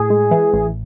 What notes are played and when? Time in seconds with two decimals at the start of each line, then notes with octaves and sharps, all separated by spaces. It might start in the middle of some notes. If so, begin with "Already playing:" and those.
Already playing: A2 G#4
0.10 G#3
0.31 E3
0.54 A1